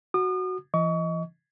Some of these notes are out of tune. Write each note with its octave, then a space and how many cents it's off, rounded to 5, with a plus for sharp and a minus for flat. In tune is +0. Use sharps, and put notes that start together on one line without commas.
F#4 +0 D#6 -40
E3 +35 D#5 +15 C#6 +30